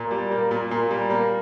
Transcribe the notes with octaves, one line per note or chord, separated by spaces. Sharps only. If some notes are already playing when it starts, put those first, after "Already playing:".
Already playing: A#2
G3
A#3
A#2
A#2
G3
A#3